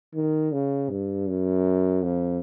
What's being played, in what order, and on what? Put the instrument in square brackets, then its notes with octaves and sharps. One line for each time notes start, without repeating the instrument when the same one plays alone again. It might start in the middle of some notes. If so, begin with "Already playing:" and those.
[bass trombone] D#3
C#3
G2
F#2
F2